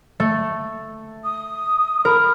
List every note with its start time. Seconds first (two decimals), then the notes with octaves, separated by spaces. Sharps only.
0.20 A3
1.23 D#6
2.05 A#4 B5